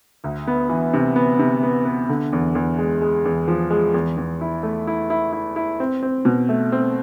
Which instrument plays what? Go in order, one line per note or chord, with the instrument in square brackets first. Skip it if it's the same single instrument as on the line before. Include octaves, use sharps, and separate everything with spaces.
[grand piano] D2
B3
E3
C3
B3
C3
B3
B3
D3
E2
E2
G#3
G#3
E2
F3
G#3
E2
E2
E4
A3
E4
E4
E4
E4
C4
C4
B2
A3
C4